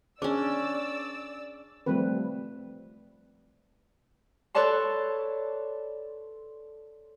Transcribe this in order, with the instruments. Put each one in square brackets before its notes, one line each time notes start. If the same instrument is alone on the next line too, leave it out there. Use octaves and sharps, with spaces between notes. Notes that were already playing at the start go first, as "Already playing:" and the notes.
[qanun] C#4 D4 [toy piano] G#4 [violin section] D5 E6
[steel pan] F3 G3 A3 C4 B4
[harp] A4 B4 C#5 D5 A5 C6